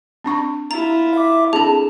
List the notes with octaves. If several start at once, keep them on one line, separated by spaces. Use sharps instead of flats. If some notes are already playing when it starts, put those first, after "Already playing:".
C4 D4 C#6
E4 F4 A#5
E5 D6
C4 D4 G#4 A4 A5